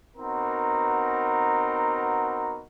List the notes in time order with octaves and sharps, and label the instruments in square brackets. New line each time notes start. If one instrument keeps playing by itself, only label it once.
[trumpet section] B3 C4 D#4 F#4 A#4